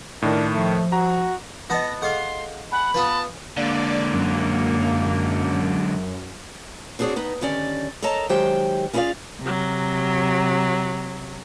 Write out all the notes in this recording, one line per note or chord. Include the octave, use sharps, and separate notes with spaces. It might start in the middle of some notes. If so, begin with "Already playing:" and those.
A2 D#3 D4 A#4
F3 A3
F#4 A#5
B3 F4 D#5 F#5 A5 A#6
G#4 A4 D#5 F5 F#5 C6
F#5 G#5 B5
B3 F4 B4 A5
D3 G#3 A#3 D5
F#2
C4 D4 F#4 G#4 C#5 D5
B3 D#4 B4
D3 D#3 C#4 G4 D5
A4 A#4 C#5 D#5 A5 A#5
D#3 F#3 G#3 G4 C5 G5
C#4 E4 F4 G#4 D5 F5
C3 F#3